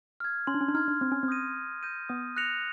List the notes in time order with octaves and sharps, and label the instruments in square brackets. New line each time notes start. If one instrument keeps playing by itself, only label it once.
[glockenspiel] F6 G#6
[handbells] C#4 [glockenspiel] C6
[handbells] D4
C#4
D4
[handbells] D#4 [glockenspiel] F6 G#6
[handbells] D4
[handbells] C4 [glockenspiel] C6
[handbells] C#4
C4
[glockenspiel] D#6 G6 A#6 D#7
C6
D#6 G6 A#6 D#7
[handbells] B3 [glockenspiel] D#6
[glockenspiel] F#6 A#6 C#7 F7